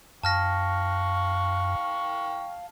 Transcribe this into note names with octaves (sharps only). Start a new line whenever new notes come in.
F#2 F5 G5 A5 C#6 F6 A#6